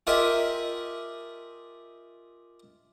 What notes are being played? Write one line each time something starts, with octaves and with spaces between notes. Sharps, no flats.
F4 G4 G#4 A#4 D#5 E5